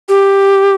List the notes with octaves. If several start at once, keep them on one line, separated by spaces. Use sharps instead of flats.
G4